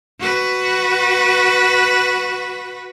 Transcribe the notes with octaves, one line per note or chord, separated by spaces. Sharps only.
F#4 B4